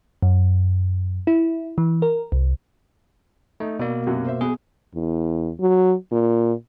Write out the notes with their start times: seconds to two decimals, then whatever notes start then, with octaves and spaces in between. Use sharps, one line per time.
0.23 F#2
1.27 E4
1.78 E3
2.02 A#4
2.32 C2
3.60 A3 D#4
3.79 B2 A#3 D5
4.07 F#2 C3 F#3
4.27 C5 E5
4.41 B1 B2 G#4
4.94 E2
5.60 F#3
6.11 A#2